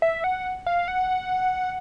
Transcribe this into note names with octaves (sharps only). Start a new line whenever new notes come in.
E5
F#5
F5
F#5